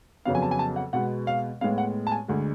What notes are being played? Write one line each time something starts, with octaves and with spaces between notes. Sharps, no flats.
F2 C#3 F#3 B3 F5
G#5
A5
G#5
A5
F#5
B2 G#3 B3 F#5
F5
A2 G#3 B3 F5
F#5
A5
G#5
D2 D3 G#3